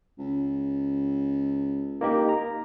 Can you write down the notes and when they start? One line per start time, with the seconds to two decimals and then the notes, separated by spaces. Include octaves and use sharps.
0.18 C#2
2.01 A#3 D#4 G4
2.29 A#5